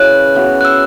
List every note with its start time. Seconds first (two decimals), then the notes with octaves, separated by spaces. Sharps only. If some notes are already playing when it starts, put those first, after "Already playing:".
Already playing: C#3 E3 C#4 B4 F#6
0.35 E3 B3 F#4
0.61 F#6
0.65 E6